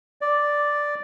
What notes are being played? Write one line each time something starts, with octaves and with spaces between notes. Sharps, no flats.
D5